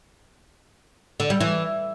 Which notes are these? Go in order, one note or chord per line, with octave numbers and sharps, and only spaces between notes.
D3
G3
E3